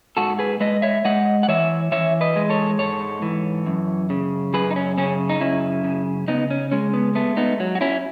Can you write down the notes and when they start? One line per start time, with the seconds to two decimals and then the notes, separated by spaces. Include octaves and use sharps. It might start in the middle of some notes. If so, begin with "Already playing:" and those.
0.17 G#2 F#4 A4
0.39 G#4 B4
0.60 G#3 B4 D#5
0.82 C#5 E5
1.05 G#3 D#5 F#5
1.43 F#5
1.48 E3 C#5 E5
1.92 E3 C#5 E5
2.21 B4 D#5
2.36 G#3
2.50 A4 C#5
2.79 G#2 A4 C#5
3.22 E3
3.66 F#2
4.10 C#3
4.54 F#2 G#4 B4
4.71 D#4
4.76 C#4
4.98 C#3 C#4
5.29 D#4
5.40 F#2 C#4 E4
5.84 C#3
6.28 C#3 B3 D#4
6.50 C#4
6.71 G#3 C#4
6.94 B3
7.15 A3 B3
7.37 B3 D#4
7.60 F#3
7.75 F#4
7.81 C#4 E4